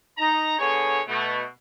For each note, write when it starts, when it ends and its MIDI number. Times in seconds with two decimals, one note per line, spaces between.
0.19 0.59 63
0.19 0.59 82
0.59 1.00 50
0.59 1.00 59
0.59 1.00 68
0.59 1.00 73
1.08 1.43 47
1.08 1.43 57